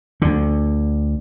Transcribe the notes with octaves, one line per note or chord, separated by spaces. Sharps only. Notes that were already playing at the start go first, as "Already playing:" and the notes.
D2 D3